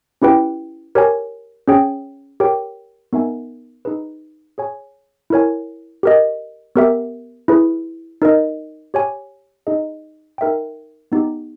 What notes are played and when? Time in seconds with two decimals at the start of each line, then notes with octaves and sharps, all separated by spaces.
0.22 C#4 E4 G4 B4 G5
0.95 G4 A#4 C#5 G#5
1.68 C#4 G#4 C#5 G5
2.40 G4 A#4 C#5 G5
3.13 B3 D#4 A#4 E5 G#5
3.85 D#4 G#4 B4
4.58 G#4 C#5 G#5
5.30 E4 A#4 C#5 G#5
6.03 G4 A#4 D#5
6.76 B3 G4 A#4 E5
7.48 E4 G#4 B4
8.22 D#4 A#4 D#5
8.94 G4 C#5 G#5
9.67 D#4 G#4 D#5
10.38 D#4 A#4 E5 G5
11.12 B3 D#4 G4